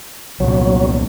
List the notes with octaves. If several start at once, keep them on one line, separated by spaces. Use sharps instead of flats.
C2 A#2 F#3